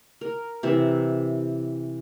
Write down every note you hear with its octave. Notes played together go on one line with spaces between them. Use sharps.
A#4
C3 E3 E5